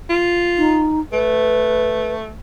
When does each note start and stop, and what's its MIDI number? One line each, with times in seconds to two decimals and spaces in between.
0.10 0.89 65
0.58 1.00 63
1.12 2.33 57
1.12 2.13 71